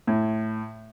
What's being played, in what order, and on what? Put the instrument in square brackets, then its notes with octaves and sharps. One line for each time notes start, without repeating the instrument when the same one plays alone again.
[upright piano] A2